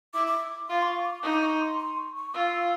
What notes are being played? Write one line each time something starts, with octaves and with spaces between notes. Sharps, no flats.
E4 D6
D6
F4 C6
D6
C#6
D6
D#4 D#6
D6
C#6
C6
C6
C#6
C#6
F4 E6